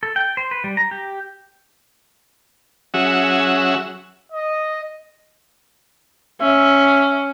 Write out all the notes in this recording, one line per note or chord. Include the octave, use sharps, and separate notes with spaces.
A4
G5
C5
B4
G3
A#5
G4
F#3 C#4 F#4 G#4 E5
D#5
C#4 E5